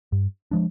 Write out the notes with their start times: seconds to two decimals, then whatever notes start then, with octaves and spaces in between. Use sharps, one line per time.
0.12 G2
0.51 F3 G#3 D4